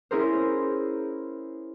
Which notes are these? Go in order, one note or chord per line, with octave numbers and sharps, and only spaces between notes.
C#4 E4 G#4 A#4 C5